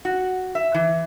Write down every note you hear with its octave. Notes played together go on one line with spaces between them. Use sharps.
F#4
E5
E3